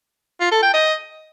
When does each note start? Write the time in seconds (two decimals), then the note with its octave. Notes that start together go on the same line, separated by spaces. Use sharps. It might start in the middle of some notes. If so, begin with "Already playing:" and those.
0.41 F4
0.52 A4
0.62 G5
0.73 D#5